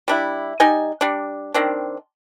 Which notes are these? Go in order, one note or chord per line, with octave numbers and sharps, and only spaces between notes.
G3 D4 E4
G3 D#4 D#5 G#5
G3 D4
D#3 C4 D4